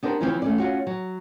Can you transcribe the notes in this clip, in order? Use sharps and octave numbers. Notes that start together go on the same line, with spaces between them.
B3 D4 G4 A#4 C5
C#3 E3 F3 G3 C4 C#4
A3 C#4 D5
C#4 F4 F#4 C#5
F#3